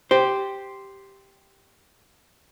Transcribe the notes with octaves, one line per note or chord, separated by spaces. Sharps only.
G4 C5